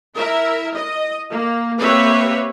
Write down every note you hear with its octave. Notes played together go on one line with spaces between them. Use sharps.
E4 A#4 E5
D#5
A#3
A#3 C4 G4 B4 C#5 E5